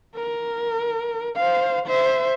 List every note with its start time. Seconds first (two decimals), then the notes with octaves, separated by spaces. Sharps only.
0.15 A#4
1.36 C5 F5
1.87 C5 E5